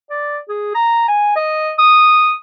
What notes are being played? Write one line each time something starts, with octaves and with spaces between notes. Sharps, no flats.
D5
G#4
A#5
G#5
D#5
D#6